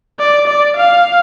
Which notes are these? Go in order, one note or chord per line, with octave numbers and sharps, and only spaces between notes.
D5
D5
F5